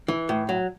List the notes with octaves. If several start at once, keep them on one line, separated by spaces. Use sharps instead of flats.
E3
A2
F#3